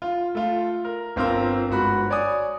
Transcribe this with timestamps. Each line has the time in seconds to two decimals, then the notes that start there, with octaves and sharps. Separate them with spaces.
0.02 F4
0.35 A3 F4
0.84 A#4
1.16 G1 C4 F4 A#4 C6 E6
1.69 G1 G#2 F#3 F#4 B5 F#6
2.10 C#5 D5 G#5 D#6